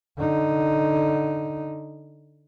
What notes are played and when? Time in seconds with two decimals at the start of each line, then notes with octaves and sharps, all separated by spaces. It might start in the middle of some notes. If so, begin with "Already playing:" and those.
0.18 D3 D#4